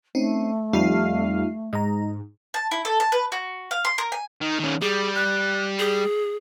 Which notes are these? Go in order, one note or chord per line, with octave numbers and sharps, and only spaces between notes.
A3 C4 C#4 D#4
F2 G3 D#4 F4 F5 C7
G#2 D#5 A#5
A5
E4
A4
A5
B4
F#4
F5
C6
A#4
G#5
D#3
D#3 C#4
G3 G#4
F#6
G#4